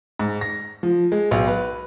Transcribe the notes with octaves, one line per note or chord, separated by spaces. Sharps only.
G#2
A#6
F3
G#3
B1
B4